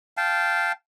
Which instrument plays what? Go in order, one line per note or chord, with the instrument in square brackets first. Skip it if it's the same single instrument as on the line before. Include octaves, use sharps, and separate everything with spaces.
[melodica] F5 G5 A5